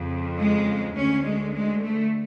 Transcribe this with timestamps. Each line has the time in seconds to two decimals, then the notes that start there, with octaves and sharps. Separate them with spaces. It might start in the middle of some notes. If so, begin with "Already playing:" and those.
Already playing: F2 C#3
0.39 G#3
0.96 D2 D3 C#4
1.25 G#3
1.54 G#3
1.83 A3